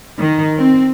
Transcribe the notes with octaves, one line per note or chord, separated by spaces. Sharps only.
D#3
C4